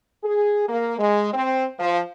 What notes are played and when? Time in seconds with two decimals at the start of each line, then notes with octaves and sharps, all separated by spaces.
0.24 G#4
0.68 A#3
0.98 G#3
1.33 C4
1.78 F3